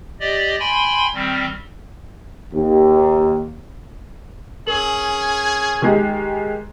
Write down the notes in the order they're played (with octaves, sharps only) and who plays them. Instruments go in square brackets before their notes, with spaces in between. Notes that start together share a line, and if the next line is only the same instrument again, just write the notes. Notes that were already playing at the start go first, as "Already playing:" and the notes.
[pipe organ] G4 D5 D#5
G5 G#5 B5 C6
D#3 G3 C4
[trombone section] D#2
[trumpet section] C#4 G#4 [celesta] A#4 F#7
[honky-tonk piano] D#3 G#3 G4